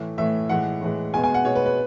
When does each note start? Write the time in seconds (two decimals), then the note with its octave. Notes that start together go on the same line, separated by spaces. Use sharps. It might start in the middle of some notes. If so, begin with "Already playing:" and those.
Already playing: A2 E3 A3
0.18 A2 E3 A3 E5
0.49 A2 E3 G#3 F#5
0.82 A2 E3 G#3
1.13 B2 G#3 B3 G#5
1.24 G#5
1.34 F#5
1.45 B2 G#3 B3 C#5
1.55 B4
1.66 B4